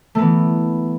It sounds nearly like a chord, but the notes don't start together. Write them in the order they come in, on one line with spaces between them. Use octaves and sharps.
A3 B3 E3